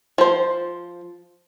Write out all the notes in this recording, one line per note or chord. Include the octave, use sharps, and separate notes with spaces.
F3 C5